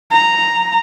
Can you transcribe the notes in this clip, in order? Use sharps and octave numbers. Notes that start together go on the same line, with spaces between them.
A#5